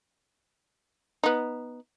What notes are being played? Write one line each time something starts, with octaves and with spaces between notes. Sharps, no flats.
B3 D#4